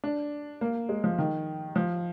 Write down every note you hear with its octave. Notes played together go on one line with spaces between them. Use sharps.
D4
A#3
G#3
F3
D#3
F3